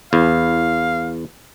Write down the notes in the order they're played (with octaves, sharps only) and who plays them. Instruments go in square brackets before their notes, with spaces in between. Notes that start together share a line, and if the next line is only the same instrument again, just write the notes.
[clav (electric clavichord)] E2 [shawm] F5